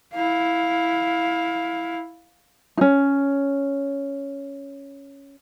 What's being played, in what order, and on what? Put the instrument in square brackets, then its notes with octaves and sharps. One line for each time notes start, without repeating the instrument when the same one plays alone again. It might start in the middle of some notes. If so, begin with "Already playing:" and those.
[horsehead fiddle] E4 F5
[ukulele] C#4 D#4